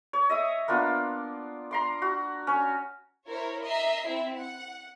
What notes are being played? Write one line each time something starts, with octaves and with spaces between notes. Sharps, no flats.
C#5
D#5 E5 D#6
A#3 B3 D4 F4
A#5 C6 D6
F#4
C#4 C#5
E4 A#4 C5 C#5
D#5 E5 A#5 C7
C4 E4 E5
F#5